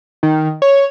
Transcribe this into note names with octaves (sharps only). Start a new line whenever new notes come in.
D#3
C#5